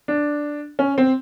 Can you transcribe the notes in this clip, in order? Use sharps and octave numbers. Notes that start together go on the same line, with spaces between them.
D4
C#4
C4